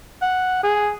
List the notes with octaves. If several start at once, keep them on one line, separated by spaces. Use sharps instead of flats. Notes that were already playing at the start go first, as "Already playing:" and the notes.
F#5
G#4